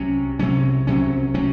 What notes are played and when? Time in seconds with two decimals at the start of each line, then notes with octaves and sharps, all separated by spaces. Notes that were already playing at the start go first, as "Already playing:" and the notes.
Already playing: C2 C3 F#3 C#4
0.39 C2 C3 F#3 C#4
0.87 C2 C3 F#3 C#4
1.34 C3 F#3 C#4